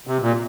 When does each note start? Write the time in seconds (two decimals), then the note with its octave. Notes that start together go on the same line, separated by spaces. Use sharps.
0.07 C3
0.22 A#2